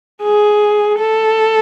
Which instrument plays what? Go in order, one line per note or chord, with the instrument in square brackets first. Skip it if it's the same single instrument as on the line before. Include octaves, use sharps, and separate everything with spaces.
[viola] G#4
A4